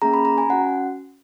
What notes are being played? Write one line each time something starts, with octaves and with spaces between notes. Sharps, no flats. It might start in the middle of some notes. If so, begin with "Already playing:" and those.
A#3 C#4 G#4 A#5
B5
A#5
G#5
C#4 F#4 F#5